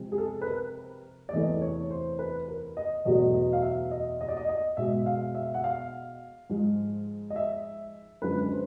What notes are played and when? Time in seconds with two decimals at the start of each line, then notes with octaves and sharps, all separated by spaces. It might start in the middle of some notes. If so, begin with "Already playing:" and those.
Already playing: C3 F3 G#3
0.12 G#4
0.18 A4
0.42 B4
0.47 A#4
1.29 D5
1.33 E2 C3 E3 A3 D#5
1.62 C#5
1.91 C5
2.19 B4
2.48 A#4
2.77 D#5
3.05 E2 B2 F#3 A3 D#5
3.34 D#5
3.53 F5
3.63 E5
3.91 D#5
4.21 D#5
4.28 D5
4.37 D#5
4.49 D#5
4.77 B2 G#3 E5
5.06 F5
5.35 E5
5.54 F#5
5.64 F5
6.50 G#2 F3 G#3
7.30 D#5
7.36 E5
8.22 F#2 D3 F3 G#3 B4
8.42 B4
8.51 C5